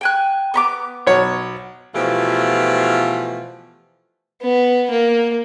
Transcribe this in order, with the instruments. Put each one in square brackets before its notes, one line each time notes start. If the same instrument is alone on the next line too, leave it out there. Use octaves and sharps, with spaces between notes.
[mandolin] G5 G#5 F#6
B3 B5 D6
[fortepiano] B1 C#5
[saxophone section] B2 E3 F3 A3 F4 G4
[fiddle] B3
A#3